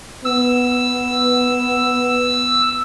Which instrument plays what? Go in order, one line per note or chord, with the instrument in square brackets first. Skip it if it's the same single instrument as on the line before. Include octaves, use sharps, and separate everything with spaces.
[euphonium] B3 [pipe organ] E6